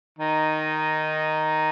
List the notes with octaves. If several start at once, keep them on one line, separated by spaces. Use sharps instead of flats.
D#3 D#4